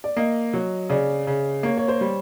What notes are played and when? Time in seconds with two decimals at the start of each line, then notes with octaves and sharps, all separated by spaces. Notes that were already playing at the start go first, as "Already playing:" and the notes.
0.04 D5
0.16 A#3 D#5
0.54 F#3
0.90 C#3 D5
1.27 C#3
1.63 A#3 C#5
1.77 C#5
1.88 C5
2.01 G3